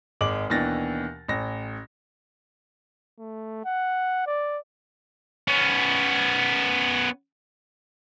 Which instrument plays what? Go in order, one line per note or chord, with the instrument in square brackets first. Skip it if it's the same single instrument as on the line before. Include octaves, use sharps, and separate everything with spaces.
[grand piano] G#1 G#3 D6 F#7
D#2 B2 E3 D4 A6 A#6
A1 A#6
[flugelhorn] A3
F#5
D5
[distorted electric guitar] B3 C#4